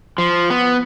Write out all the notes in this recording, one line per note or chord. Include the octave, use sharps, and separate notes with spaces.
F3
B3